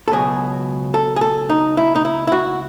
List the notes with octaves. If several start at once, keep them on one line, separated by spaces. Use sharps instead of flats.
A4
C#2 B2 F#3 G#4
A4
G#4
A4
D#4
E4
D#4
E4
E4
F#4